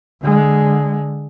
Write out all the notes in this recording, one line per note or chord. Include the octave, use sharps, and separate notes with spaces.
D3 G#3